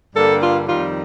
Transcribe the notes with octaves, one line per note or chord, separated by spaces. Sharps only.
G2 D3 G3 A#3 D4 A4
F4
F2 D#3 G3 F4